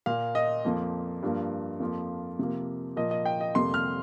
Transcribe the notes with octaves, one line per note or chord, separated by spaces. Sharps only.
A#2 A#3 F5
D#5
F2 F3 A#3
G2 F3 A#3
F2 F3 A#3
C3 F3 A#3
A#2 F3 A#3 D#5
D#5
G5
D#5
F2 C3 G3 A#3 C6
F6